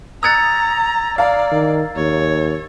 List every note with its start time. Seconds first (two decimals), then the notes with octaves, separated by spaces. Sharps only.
0.23 A#5 D#6 E6 F#6 G#6 A6 C#7
1.18 D5 F5 A#5
1.52 D#3
1.96 D#2 C#5